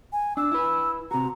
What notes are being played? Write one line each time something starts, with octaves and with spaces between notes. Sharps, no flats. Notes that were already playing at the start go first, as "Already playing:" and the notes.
G#5
D4 E6
E4 B4
C3 F#4 A#5